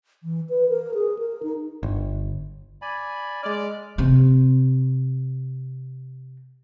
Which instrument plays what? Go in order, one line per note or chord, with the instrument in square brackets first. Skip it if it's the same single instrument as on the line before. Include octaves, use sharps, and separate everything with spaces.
[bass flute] E3
B4
A#4
G#4
A#4
D#4
[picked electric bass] G1
[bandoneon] D5 G#5 B5
[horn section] G#3 D5 [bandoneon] F6
[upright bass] C3 C4